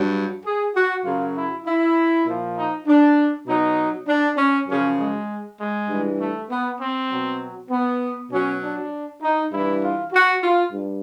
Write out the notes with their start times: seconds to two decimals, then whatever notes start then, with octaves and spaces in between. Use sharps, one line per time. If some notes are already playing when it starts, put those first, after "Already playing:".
Already playing: G2 F#3
0.44 G#4
0.74 F#4
1.03 F#2 C#3 F#3 F4
1.34 E4
1.64 E4
2.26 A#2 F3
2.55 D#4
2.86 D4
3.47 B2 F#3 D#4
4.07 D4
4.36 C#4
4.67 F#2 C#3 F3 C#4
4.98 G#3
5.59 G#3
5.88 G2 E3
6.19 A3
6.49 B3
6.79 C4
7.10 B2 F#3
7.70 B3
8.30 B2 F#3 C#4
8.62 D4
9.21 D#4
9.51 G2 E3 E4
9.82 F4
10.13 F#4
10.43 F4
10.73 G2